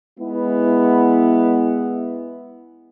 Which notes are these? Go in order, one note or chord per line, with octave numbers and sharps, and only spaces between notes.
G#3 B3 E4